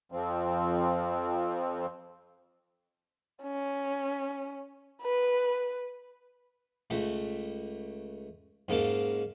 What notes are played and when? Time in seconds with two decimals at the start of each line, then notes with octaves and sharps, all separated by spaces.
0.12 F2 F3 C4
3.43 C#4
5.02 B4
6.90 C#2 A3
8.69 G#2 C#3 A#3 A5